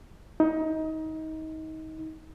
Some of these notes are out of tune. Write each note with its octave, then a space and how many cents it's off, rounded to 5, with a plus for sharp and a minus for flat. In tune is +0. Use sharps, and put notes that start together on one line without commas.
D#4 +25